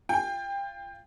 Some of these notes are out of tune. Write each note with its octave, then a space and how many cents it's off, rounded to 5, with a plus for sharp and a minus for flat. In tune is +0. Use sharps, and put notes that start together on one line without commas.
F4 -15 G5 +25